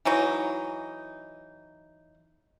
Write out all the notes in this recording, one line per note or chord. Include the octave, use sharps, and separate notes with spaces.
E3 F#3 D#4